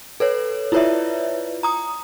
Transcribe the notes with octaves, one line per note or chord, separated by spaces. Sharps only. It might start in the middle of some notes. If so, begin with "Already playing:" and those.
A4 B4 C#5
E4 F4 B4 C#5 D5 E5
A#5 D#6